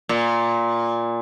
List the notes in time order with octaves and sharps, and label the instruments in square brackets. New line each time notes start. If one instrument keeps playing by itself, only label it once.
[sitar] A#2